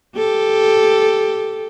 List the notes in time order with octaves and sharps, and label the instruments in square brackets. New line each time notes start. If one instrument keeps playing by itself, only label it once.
[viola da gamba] G4 A4